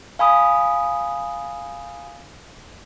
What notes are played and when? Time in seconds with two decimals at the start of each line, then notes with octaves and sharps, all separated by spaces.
0.19 F5 G#5 B5 D#6